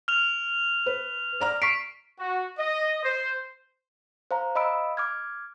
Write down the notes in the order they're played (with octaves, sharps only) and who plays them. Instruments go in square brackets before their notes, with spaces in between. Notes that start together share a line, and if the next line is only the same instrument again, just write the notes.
[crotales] F6 F7
[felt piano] B4
D5 A#5 F6
[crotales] C#6 B6 D7 [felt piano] C7
[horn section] F#4
D#5
C5
[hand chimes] C5 F5 A#5
D#5 F5 B5 E6 D7
D6 F6 G#6